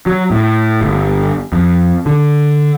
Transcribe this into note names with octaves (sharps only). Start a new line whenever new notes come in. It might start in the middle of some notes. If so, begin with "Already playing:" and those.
F#3
A2
G1
F2
D3